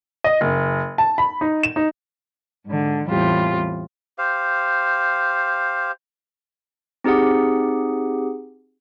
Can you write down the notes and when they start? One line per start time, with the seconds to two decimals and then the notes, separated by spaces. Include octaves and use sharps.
0.24 D#5
0.41 F#1
0.98 A5
1.18 B5
1.41 D#4
1.63 E7
1.76 D#4
2.65 G#2 D3
3.08 E2 A2 G3 C4 F4 G4
4.18 G4 C5 F5
7.04 C4 D#4 G4 G#4 F#5